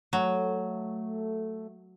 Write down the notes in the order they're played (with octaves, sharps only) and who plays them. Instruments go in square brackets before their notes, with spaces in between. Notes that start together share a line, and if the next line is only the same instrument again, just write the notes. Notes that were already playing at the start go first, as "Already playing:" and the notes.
[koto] F#3 [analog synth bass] A3